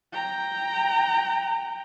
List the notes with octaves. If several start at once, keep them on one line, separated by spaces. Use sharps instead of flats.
G5 A#5